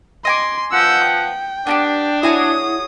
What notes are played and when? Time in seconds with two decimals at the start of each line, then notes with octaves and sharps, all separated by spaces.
0.25 D#5 G#5 C6 D6
0.72 F3 B3 F#5 E6 G6
1.05 G5
1.67 B3 D4 F#4 G4
2.23 E4 F#4 G#4 C#5 D#6